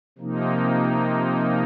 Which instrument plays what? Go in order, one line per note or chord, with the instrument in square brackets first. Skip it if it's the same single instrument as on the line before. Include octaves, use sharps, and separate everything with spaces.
[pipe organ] C3 F3 A#3 D#4